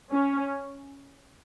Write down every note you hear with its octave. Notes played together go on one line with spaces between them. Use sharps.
C#4